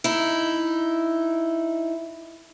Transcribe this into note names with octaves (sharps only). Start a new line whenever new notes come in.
D#4 E4